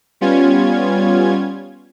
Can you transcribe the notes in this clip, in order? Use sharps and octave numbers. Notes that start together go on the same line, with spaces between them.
G3 B3 C#4 F4 G#6